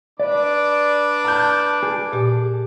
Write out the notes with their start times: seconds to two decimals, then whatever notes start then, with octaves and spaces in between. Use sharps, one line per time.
0.20 D4 B4 D5 D6
1.24 A5 F6 G6
1.83 G#4
2.13 A#2 G4